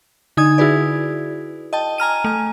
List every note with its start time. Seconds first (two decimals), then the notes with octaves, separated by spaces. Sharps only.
0.37 D3 D#4 G#5 D#6 G#6
0.58 E4 F#4 G#4 B4 D5
1.73 D#5 G5 A5
1.98 G#5 A#5 F6 D#7
2.24 A3 G#5